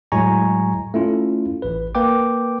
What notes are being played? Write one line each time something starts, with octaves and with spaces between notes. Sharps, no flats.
A2 F#3 G#3 G#5 A#5 C#6
A3 C#4 E4 F4
A1 B4
A#3 B4 G5 D6